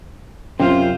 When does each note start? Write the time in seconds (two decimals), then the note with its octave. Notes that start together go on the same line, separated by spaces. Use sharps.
0.60 F#2 C3 C#4 F4 C5